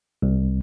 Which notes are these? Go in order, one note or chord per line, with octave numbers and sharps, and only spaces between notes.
C2